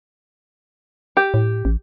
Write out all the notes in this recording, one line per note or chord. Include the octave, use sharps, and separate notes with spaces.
G4
A2
A1